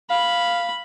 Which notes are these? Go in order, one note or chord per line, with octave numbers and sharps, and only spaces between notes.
F5 B5